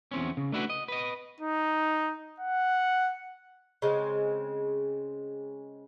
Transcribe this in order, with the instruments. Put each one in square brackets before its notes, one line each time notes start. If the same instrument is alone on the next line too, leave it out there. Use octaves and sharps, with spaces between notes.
[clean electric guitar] E2 C4 C#4
C#3
A3 D4 E4 F#4 B4
D#5
B4 D#5
[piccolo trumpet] D#4
F#5
[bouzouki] C#3 G#3 C4